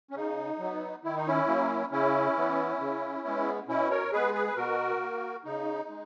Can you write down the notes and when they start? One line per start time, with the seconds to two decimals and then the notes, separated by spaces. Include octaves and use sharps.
0.11 C#4
0.15 C#3 D#4
0.59 F#3
0.64 B3
1.04 D#3 E4
1.16 D#4
1.27 C#4 E4
1.47 F#3 A#3
1.92 C#3 C#4 E4
2.37 E3 B3
2.80 C#3
3.24 G#3 B3
3.68 B2 C#4 E4
3.90 A#4 C#5
4.12 G#3 B3 G#4 B4
4.34 G#4 B4
4.47 B4
4.56 B2 F#4 A#4
5.00 A#3
5.44 C#3 D#4
5.89 G#3